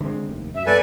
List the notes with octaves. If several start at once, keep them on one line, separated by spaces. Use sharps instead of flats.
D3 G#3 C4
F1 D#2
F#2 E5
G2 A#3 B3 A4 B4 D5 G#5